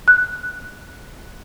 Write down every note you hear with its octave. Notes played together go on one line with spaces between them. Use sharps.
F#6